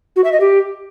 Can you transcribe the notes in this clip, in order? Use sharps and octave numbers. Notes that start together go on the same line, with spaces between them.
F#4
E5
D#5
G4